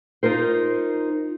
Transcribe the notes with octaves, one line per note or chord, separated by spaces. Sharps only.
D#4 F4 A#4 C5